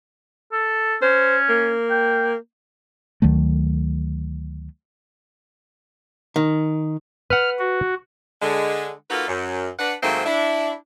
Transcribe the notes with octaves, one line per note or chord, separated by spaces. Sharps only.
A4
C#4 C5
A#3
G5
D2 D#3 F#3 A3
D#3
B4 F#5 F6
F#4
D3 G#3
A#3 D#4 F4 F#4 A4 B4
F#2
D4 B4 F#5
G#2 D#3 F#3 A3 A#3 C4
D4 E4